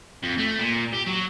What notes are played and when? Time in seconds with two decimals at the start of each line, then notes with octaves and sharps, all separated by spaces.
0.23 F2
0.38 A3
0.60 A#2
0.93 G4
1.06 F#3